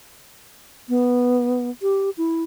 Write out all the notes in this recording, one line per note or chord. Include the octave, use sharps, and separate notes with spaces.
B3
G4
E4